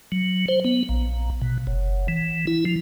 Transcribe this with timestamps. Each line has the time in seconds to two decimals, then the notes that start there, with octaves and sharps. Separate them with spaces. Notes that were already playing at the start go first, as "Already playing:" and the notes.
0.12 F#3
0.48 C5
0.64 B3
0.89 A#1
1.42 B2
1.67 F#1
2.08 E3
2.47 E4
2.65 F3